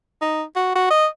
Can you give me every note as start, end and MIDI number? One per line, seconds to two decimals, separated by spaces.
0.22 0.43 63
0.56 0.71 66
0.75 0.90 66
0.90 1.07 75